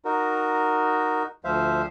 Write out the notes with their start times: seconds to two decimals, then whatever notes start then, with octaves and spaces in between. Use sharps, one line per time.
0.05 D#4 F#4 A#4
1.45 D2 F3 C5 E5 F5